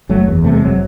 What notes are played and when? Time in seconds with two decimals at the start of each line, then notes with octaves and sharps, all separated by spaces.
0.09 F#1 F#3 A3
0.28 E2
0.44 C3 A3
0.54 G#3
0.61 F#1 F#3